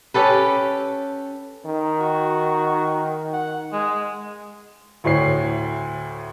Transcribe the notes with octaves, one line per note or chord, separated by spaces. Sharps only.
C#4 G4 A4 B4
D#3
F#4
F#5
G#3
D2 A2 C#5 C7